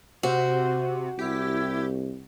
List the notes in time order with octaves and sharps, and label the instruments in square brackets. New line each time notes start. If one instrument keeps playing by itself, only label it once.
[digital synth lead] C3 [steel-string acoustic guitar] F#4 [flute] C5
[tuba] C2 [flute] E4 [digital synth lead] G4